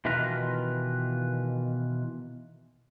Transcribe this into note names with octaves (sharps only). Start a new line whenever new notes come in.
B2 D#3 E3 F4 B4 A#5